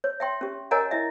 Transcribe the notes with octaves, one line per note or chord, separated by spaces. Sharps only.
C#5
E5 G5 C6
C#4 G4
A#4 C#5 D#5 F#5 G#5 A#5
E4 D#5 E5